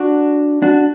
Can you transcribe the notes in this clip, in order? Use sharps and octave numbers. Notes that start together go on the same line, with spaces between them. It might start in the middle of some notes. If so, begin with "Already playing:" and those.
Already playing: D4 F#4
D4 F#4